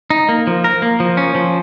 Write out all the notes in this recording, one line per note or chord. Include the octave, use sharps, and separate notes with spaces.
D#4
A#3
F3
A#4
A#3
F3
C#4
F3